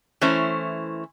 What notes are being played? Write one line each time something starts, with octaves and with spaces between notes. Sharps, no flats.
E3 A3 C#4 E4 C5